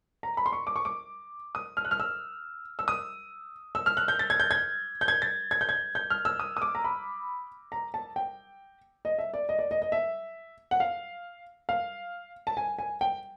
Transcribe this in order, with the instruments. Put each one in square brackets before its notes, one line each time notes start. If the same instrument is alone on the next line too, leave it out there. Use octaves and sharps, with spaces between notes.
[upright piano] A#5
B5
C6
C#6
D6
C#6
D6
D#6
F6
F#6
F6
E6
E6
D#6
E6
F6
F#6
G6
A6
G#6
G6
G#6
G6
G#6
A6
G#6
G6
G#6
G6
F6
E6
D#6
D#6
D6
A#5
B5
A#5
A5
G5
D#5
E5
D5
D#5
D5
D#5
D#5
E5
F#5
F5
F5
A5
G#5
G#5
G5